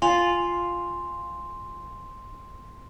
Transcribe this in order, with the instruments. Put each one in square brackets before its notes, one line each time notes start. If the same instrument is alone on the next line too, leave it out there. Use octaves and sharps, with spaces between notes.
[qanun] F4 [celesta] G#5 [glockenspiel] C6 F7